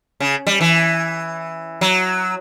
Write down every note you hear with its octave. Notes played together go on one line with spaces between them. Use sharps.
C#3
G3
E3
F#3